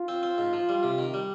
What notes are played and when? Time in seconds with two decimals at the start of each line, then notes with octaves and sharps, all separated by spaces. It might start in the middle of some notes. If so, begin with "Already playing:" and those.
Already playing: F4
0.08 C4
0.23 C4
0.38 G#2
0.53 F3
0.69 G3
0.83 C3
0.98 D#3
1.14 G3